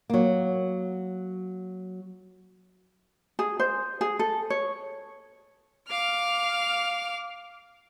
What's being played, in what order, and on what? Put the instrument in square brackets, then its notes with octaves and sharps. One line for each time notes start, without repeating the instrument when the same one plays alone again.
[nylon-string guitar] F#3 A#3
[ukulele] G#4
C5
G#4
A4
C#5
[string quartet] F5 D6 F6